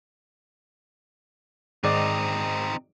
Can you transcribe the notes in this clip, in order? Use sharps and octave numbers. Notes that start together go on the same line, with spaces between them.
G#2 D#3 C4 D#4 D5